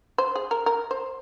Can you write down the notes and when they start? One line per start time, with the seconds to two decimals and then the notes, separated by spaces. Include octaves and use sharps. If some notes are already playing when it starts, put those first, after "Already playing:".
0.18 C5
0.35 G#4
0.51 A#4
0.66 A#4
0.91 C5